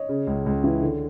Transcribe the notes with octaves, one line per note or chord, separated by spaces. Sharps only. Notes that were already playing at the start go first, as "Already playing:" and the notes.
Already playing: C#5 D#5
C#3
C#2
C#2
E3
D3